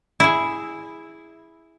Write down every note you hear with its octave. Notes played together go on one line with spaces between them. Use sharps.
E4 G#4